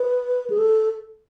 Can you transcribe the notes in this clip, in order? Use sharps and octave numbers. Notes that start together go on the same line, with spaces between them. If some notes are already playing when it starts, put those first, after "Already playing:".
Already playing: B4
G#4
A4